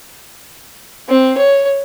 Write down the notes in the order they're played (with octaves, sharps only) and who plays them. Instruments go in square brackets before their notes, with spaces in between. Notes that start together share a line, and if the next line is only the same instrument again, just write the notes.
[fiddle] C4
C#5